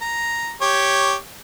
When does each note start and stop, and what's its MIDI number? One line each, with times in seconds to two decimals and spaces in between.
0.02 0.52 82
0.61 1.15 67
0.61 1.15 73